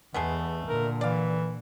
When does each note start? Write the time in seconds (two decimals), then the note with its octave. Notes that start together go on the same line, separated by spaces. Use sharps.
0.14 E2 G#3 A3 B3
0.68 A#2 D3 A#4
1.01 E3 D5 F5